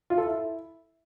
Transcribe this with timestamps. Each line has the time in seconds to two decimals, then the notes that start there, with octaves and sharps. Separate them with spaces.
0.10 F4
0.18 A4
0.25 E4